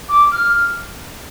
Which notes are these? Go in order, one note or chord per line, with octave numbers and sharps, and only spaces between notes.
D6
F6